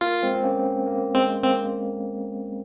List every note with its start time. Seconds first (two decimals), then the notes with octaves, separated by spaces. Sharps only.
0.01 A#3 F4
0.23 G#3 C4
0.35 C4
0.44 A#3 C#4
0.87 A#3
1.15 G#3 C4
1.43 A#3 C4